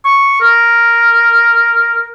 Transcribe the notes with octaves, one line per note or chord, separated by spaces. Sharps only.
C#6
A#4